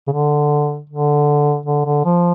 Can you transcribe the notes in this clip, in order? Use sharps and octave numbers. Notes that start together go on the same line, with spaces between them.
C#3
D3
D3
D3
D3
F3